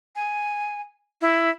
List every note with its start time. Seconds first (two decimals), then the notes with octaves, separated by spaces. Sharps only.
0.16 G#5
1.21 E4